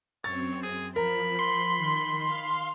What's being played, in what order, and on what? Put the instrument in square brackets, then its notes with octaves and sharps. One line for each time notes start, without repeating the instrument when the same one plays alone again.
[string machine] F#2 C4 [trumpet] C#5 [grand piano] A6
[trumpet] G#4
[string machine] F3 [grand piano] A#4 [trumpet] B5
[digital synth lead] C6
[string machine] D#3
F5